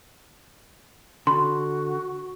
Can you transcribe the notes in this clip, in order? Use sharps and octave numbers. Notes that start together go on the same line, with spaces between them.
D3 F#4 B5 C6